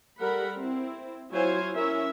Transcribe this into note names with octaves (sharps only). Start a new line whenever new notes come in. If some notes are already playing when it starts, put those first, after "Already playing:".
G3 A4 A#4 F#5 B5
C4 E4
F#3 E4 F4 C5 C#5 G#5
C#4 E4 A#4 E5